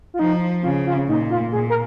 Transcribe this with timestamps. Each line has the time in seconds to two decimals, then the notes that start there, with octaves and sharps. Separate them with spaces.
0.14 F4
0.19 F3 D#4
0.63 C#3 F4
0.86 F4
1.09 A#2 D#4
1.31 F4
1.52 A#2 G#4
1.70 A#4